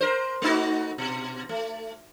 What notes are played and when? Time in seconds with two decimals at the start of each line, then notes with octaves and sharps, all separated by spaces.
0.01 A#4 C5
0.42 A3 D#4 F#4
0.98 B2
1.49 A3